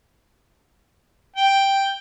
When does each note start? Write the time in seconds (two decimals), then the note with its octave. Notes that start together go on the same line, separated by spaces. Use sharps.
1.36 G5